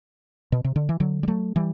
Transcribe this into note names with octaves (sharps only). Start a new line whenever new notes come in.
B2
C3
D3
E3
D3 F#3
G3
F#3 A3
E3 G3